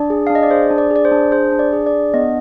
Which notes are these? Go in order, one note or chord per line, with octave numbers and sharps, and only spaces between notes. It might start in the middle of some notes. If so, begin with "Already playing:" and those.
Already playing: D4 D5
G#4
F5
D4
D#5
D5
G#4 C5
D4
D5
G#4
D5
C5
D4
G#4 C5
D4
D5
G#4
D5
D4
B3 D#5